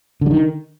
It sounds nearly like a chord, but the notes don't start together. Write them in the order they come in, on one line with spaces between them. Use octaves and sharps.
D3 G3 D#3